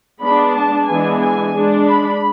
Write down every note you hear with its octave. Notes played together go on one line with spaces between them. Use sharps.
G#3 B3 D4 B5
A5
E3 G#3 B3 D4 G#5
G#5
G#3 D4
B5